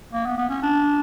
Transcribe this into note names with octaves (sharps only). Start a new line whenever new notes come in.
A#3
B3
B3
C#4
D4